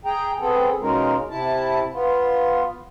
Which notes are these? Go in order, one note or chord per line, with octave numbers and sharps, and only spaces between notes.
G#4 G5 A#5
B3 C4 G#4 A4
B2 G#3 C#4 D#4 F4 A#4
C3 E4 A5
B3 F4